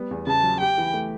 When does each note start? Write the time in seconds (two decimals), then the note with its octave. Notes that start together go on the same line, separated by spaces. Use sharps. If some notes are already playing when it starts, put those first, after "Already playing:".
Already playing: G3 B3
0.11 E2
0.27 C#3 A5
0.44 F#3
0.61 G4 G5
0.78 E3
0.94 A3